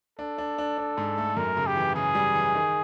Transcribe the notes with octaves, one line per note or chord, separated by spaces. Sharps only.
D4 A4
D4
D4
D4
G#2
A3
F#2 A#4
C#3
G4
E3
C#3 G#4
G3
E3
D#3